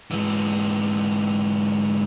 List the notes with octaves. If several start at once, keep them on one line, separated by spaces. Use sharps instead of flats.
G#2 E3